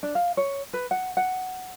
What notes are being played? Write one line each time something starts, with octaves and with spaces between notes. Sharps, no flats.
D4
F5
C#5
B4
F#5
F#5